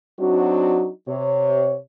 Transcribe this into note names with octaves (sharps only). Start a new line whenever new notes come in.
F#3 C4 D4 D#4 F#4
C3 C#5